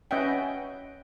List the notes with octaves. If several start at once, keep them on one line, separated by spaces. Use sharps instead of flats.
C#4 B4 D#5 E5 F#5 G5